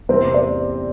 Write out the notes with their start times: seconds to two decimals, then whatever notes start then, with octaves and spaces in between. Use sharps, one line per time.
0.09 E2 C3 G3 C4 C5
0.34 D5